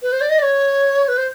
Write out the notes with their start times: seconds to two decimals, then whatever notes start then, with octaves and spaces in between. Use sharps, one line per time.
0.02 B4
0.12 C5
0.21 D5
0.30 D#5
0.39 D5
0.42 C#5
1.08 B4
1.18 C5